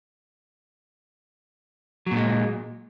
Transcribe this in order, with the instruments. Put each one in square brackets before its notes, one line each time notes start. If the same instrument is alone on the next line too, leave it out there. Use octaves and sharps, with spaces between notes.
[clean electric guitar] F#3
A#2
G#3